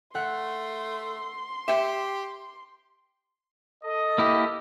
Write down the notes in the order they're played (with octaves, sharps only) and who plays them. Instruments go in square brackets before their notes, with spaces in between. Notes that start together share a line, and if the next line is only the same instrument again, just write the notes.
[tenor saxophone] A3 [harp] F#5 [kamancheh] C6
[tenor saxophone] G4 [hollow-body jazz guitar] E5 G5
[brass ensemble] A4 D#5
[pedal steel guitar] A#3 E4 G4